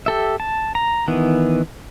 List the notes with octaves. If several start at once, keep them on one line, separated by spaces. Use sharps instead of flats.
G4 A4 E5
A5
A#5
D#3 E3 B3